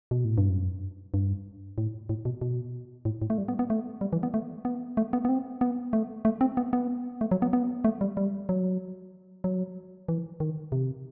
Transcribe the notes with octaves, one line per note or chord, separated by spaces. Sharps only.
B2
A2
G2
F#2
G2
A2
A2
B2
B2
A2
A2
A3
G3
B3
B3
A3
G3
E3
B3
A3
B3
A3
B3
B3
C4
B3
A3
A3
C4
B3
B3
A3
F#3
B3
B3
A3
G3
G3
F#3
F#3
E3
D#3
C3